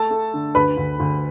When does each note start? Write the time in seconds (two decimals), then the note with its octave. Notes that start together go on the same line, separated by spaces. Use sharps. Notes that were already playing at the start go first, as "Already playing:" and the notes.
Already playing: A3 A4 A5
0.11 A3
0.34 D3
0.55 D2 B4 B5
0.77 D2
1.00 D2